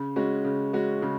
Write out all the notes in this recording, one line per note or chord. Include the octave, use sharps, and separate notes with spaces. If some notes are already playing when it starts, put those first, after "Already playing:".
Already playing: C#3
G#3 C#4 F#4
C#3
G#3 C#4 F#4
C#3